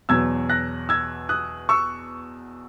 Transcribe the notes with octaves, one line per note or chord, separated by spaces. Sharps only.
E2 B2 F#3 E6 G#6
F#6 A#6
E6 G#6
D#6 F#6
C#6 E6